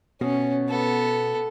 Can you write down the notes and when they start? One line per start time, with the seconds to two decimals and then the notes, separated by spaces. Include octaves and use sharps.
0.21 B2 C#4
0.69 B3 A4